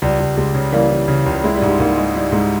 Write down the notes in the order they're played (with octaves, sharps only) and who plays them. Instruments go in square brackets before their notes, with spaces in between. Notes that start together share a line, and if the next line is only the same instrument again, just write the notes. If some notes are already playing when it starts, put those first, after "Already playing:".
[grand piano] C#2 [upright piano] G3
[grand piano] C#2
[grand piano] C#2 [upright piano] G#3
[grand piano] C#3
[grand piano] E3 [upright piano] G3 A#3
[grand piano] E3
C#3
C#2
[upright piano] G#3 [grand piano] E4
[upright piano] G3
[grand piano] G#2
[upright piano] G#3
[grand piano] G#2 [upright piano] G3 A#3
[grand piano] G#3
[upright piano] G3 [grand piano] E4
[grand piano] G#2 [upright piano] G#3